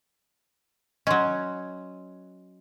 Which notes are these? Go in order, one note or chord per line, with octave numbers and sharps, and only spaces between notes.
F#3 C#4 D#5 C6